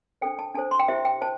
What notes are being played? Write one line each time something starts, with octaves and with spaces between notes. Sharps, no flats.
D4 A4 C5 G5
A5
D4 A4 C5 A5
C6
G5
E4 G4 C5 E5
G5
C5 A5